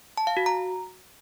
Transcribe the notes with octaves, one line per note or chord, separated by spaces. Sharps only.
A5
F5
F#4
A#5